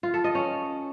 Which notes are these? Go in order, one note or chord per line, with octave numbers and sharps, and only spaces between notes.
F4
A4
D#5
C#4